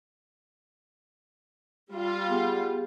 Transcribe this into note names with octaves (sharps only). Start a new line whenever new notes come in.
G3 F4
B3 G4 G#4